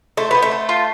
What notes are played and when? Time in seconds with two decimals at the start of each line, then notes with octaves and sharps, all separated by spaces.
0.17 A3 C5
0.31 B3 C5
0.42 A3
0.51 C5
0.69 F4